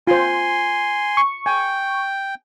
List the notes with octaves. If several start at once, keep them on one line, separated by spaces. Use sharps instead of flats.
F4 C5 G#5 C6
C#6
G5 G#5